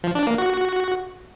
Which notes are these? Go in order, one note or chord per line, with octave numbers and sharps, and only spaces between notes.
F3
D4
A#3
F#4